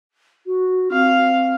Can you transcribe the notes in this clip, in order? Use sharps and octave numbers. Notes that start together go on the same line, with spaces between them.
F#4
C4 F5